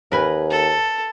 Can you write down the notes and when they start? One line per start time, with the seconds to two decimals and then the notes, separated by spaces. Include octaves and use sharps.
0.12 D#2 A#4 B4 G#5
0.51 A4